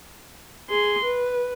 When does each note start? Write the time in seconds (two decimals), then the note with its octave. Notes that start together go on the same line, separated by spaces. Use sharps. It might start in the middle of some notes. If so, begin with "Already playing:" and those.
0.70 G#4 C6
1.05 B4